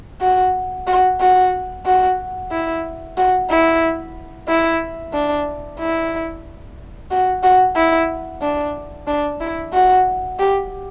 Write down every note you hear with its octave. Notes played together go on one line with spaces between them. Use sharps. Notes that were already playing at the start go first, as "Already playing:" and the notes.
F#4
F#4
F#4
F#4
E4
F#4
E4
E4
D4
E4
F#4
F#4
E4
D4
D4
E4
F#4
G4